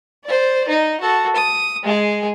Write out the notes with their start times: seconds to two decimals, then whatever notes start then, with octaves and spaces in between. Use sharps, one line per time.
0.24 C5 D5
0.69 D#4
1.01 F#4 A4
1.36 D#6
1.84 G#3 G#4